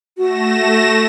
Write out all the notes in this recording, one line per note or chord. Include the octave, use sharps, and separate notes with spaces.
A3 F#4 A#6 E7